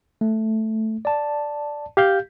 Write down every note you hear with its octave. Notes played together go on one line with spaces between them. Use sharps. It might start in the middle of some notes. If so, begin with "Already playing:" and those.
A3
D5 A5
G4 F5 G6